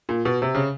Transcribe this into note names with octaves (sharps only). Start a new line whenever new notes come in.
A#2
B2
C3
C#3